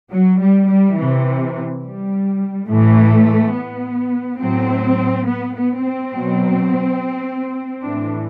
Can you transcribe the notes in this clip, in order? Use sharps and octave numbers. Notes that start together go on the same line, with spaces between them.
F#3
G3
G3
C3 E3
G3
A2 E3 A3
B3
A2 F#3 C4
B3
B3
C4
B2 F#3
A2 E3 D4